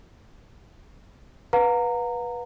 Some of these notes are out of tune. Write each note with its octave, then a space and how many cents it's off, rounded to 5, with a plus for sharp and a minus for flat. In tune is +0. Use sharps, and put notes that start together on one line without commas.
B4 -15 F5 +45 A#5 -20